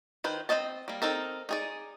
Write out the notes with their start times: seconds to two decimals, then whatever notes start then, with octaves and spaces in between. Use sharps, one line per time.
0.24 D#3 B4 C5
0.49 C4 E4 C5 D#5 A5
0.88 G3 A#3
1.02 C4 D#4 A4 A#4
1.49 D#4 G#4 D5